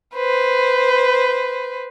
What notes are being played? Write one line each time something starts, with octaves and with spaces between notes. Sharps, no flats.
B4 C5